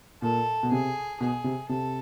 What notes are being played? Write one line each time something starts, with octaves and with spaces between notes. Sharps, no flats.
A#2 A4
B2
C3 G#4
B2 G#4
C3
C3 A4